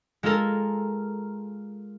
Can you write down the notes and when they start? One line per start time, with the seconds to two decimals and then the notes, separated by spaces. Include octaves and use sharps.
0.23 G#3 F4 A4 A#4